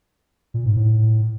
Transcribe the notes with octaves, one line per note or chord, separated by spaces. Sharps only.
A#2
G#2
A2